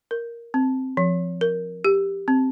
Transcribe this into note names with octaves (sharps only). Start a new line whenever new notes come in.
A#4
C4
F3
A#4
G4
C4